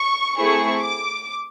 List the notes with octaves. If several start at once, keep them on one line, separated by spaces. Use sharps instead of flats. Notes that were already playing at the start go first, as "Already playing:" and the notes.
Already playing: C#6
A3 C4 E4 G#4 C#6
D6